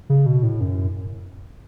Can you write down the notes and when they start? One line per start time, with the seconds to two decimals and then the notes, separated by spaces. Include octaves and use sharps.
0.10 C#3
0.26 B2
0.43 A2
0.61 F#2